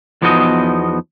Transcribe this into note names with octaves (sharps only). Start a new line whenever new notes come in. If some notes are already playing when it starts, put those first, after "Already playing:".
E2 F3 B3 D#4 F#4 D#5